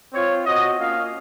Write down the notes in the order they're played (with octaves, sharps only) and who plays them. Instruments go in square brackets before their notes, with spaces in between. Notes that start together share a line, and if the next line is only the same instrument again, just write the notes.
[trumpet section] C4 F4 C#5
C4 F#4 D#5
A#3 C#4 F4 F5